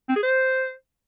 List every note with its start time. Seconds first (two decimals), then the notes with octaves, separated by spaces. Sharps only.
0.09 C4
0.16 G#4
0.23 C5